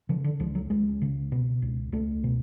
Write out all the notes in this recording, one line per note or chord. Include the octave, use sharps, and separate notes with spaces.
C#3 F3
D3
C#2 F3
F#3
C#2 G#3
C#3
B2
C#2
C#2 A3
B2